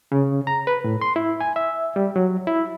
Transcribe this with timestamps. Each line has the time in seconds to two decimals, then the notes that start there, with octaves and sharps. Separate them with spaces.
0.12 C#3
0.47 A#5
0.67 B4
0.84 A2
1.01 C6
1.16 E4
1.41 G#5
1.56 E5
1.96 G3
2.16 F#3
2.47 E4